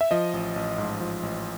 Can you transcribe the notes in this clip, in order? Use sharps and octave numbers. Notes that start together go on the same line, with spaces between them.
E5
F3 D#5
A1
A1
G#2
F3
A1